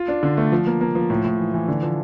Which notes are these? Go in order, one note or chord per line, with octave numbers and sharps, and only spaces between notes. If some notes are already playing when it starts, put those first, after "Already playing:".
Already playing: F4
D4
D3
A3
F3
A#3
A#3
F3
A2
A2
E3
E3
D3
F3